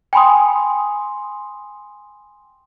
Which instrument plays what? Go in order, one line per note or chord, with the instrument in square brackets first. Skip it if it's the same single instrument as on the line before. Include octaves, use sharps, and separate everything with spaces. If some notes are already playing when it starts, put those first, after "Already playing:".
[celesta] G5 G#5 B5 C6 D#6